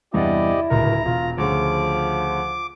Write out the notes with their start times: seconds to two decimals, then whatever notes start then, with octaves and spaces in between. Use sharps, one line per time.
0.14 E2 G2 C3 E4 G4 D5 D#5
0.70 D1 C#2 A#4 A#5
1.05 E1 F4
1.38 D2 C#3 F3 D6